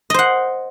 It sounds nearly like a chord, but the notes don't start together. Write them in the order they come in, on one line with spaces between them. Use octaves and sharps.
D#5 C5 F#5